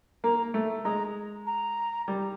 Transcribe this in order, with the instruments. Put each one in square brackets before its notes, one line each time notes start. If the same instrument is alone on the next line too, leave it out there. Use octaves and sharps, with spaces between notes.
[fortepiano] A#3 [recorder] A#5
[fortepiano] A3
[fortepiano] G#3 [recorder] A#5
[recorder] A#5
[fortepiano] G3